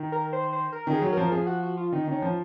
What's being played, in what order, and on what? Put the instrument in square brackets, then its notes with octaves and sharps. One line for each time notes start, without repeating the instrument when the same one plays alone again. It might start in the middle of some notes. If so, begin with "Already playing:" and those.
Already playing: [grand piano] D#3
[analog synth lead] A#4
C5
C5
A#4
[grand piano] D#3
[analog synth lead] G#4
[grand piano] F#3
[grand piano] F3 [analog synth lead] A#4
[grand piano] F3 [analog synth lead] G#4
[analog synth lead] F#4
F#4
F4
[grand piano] D#3 [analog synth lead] D#4
[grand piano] D#3 [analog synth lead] C#4
[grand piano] F3